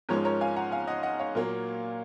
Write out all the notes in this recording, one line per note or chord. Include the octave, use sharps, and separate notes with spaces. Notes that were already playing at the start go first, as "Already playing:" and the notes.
G#2 F3 G#3 C#4 A#4 C#5
A#4 C#5
F5 G#5
F#5 A#5
F5 G#5
D#5 F#5
D#5 F#5
C#5 F5
A#2 F#3 A#3